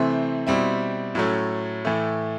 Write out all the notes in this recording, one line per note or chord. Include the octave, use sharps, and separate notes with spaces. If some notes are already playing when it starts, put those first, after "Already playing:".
Already playing: C3 E3 A3 C4
B2 G3 C4 E4
A2 F#3 A3 C#4
A2 E3 A3